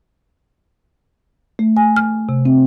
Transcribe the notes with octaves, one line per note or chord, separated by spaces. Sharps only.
A3
G#5
F6
C3
C4